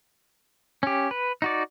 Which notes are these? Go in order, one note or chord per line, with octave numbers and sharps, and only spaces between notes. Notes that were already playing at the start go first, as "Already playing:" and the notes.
C#4 G4
B4
D#4 F#4 D5